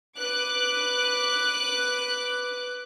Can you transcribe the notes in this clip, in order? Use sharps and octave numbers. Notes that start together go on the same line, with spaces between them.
B4 D6 F#6